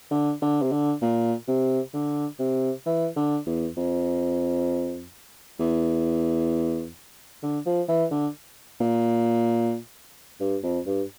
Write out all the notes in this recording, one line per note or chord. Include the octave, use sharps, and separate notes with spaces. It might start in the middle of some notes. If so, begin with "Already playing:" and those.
D3
D3
C3
D3
A#2
C3
D3
C3
E3
D3
E2
F2
E2
D3
F3
E3
D3
A#2
G2
F2
G2